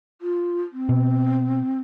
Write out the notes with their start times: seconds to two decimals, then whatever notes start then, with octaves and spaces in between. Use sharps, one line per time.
0.21 F4
0.72 C4
0.89 B2